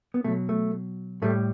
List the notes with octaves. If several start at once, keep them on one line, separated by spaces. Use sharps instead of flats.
B3
B2 F#3 A3
A3
A2 G3 A3